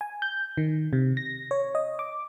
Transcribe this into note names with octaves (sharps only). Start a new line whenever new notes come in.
G#5
G6
D#3
C3
A#6
C#5
D#5
D6